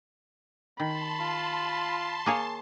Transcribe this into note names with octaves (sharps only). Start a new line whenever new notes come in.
D#3 A5 B5 C6
F4
A#3 G#4 C#5